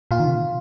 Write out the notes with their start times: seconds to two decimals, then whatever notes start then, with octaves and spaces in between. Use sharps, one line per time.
0.11 A#2 F4
0.20 D#3
0.27 C3
0.35 A#2